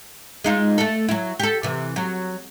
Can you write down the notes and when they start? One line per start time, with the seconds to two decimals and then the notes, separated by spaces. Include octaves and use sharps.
0.44 G#3 D#4 F4
0.78 A3 A4
1.08 F#3 E4
1.40 G4 A4
1.63 C3 E3
1.96 F#3